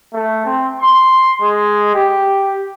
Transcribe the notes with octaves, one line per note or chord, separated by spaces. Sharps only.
A3
C4
C6
G#3
G4